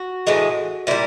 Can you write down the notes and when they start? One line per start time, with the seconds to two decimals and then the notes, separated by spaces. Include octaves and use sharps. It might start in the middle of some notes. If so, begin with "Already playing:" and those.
Already playing: F#4
0.27 A2 E3 G#3
0.87 A#2 G3 E4